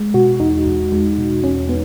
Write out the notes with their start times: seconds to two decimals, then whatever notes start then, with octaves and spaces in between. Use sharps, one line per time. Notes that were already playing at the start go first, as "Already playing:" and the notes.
Already playing: G#3
0.14 B2 F#4
0.40 E2 D#4
0.66 E2
0.92 G#3
1.18 B2
1.44 E2 C#4
1.69 B3